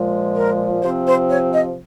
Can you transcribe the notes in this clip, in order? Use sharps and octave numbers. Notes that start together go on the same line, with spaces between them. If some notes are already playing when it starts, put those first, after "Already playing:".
Already playing: A#2 F3 G#3
A#4
C3 F3 C4 C5
C5
C#5
D#5